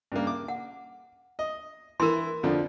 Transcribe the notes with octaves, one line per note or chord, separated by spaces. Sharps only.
G2 C#3 A#3
D6
F#5
D#5
E3 E4 A#4 C6
F2 D3 F3